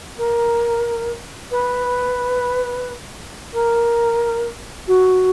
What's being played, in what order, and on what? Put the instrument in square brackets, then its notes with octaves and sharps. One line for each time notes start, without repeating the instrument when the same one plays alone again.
[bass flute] A#4
B4
A#4
F#4